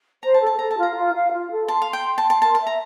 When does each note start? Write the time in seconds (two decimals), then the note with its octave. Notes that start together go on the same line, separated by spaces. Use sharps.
0.23 C5 A#5
0.34 A5
0.41 A4
0.46 A5
0.59 A4 A#5
0.71 A5
0.78 F4 A#5
0.96 F4
1.14 F5
1.32 F4
1.50 A4
1.68 A5 C6
1.82 F5
1.87 C6
1.93 G5
2.06 G5
2.18 A5
2.24 C6
2.30 A5
2.42 A#4 A5
2.55 A5
2.61 E5
2.67 A#5